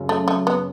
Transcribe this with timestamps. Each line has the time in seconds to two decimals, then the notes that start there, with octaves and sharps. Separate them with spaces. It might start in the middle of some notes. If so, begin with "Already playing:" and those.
Already playing: F#2 C#3
0.09 A3
0.28 A3
0.47 B3